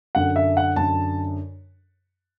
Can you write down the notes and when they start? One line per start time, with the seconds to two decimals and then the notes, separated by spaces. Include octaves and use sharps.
0.15 F#2 D3 F#5
0.36 E5
0.57 F#5
0.76 F#2 D3 A5